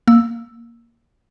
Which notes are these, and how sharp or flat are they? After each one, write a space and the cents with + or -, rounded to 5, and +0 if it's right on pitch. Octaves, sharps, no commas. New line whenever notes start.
A#3 +0 E6 +0